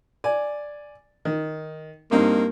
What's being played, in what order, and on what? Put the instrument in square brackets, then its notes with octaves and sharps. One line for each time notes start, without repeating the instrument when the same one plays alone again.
[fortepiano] D5 G#5
D#3
[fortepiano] G2 C4 D#4 [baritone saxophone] A#3